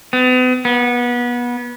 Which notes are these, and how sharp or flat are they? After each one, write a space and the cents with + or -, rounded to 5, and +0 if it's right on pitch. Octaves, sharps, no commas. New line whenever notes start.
B3 +40
B3 -25